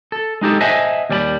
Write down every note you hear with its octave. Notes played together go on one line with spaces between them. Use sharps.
A4
G#3 D#4 G4 A4
C5 D#5 E5 F#5 G#5 A5
D#2 G3 D5 G5 B5